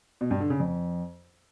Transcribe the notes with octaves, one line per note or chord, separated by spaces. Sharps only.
B2
G2
D3
C#3
F2